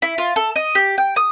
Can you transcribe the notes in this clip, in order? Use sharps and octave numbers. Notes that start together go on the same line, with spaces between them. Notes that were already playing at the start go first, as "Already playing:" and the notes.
E4
F4
A4
D#5
G4
G5
D#6